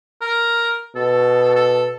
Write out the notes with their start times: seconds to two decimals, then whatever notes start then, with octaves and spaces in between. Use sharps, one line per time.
0.22 A#4
0.96 B2 A4
1.56 A4